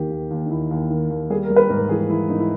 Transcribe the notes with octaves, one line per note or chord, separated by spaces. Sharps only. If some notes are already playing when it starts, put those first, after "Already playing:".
Already playing: D#2 D#3 G4
D#2
D#2
D#4
D#2 E4
D#2
D#3
D#2
G3 G#4
A#4
G3
B4
G#2 A#4
E3 G#4
E3 E4
G#2 D#4
E4